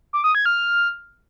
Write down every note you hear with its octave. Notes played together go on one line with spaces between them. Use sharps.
D6
D#6
G#6
F6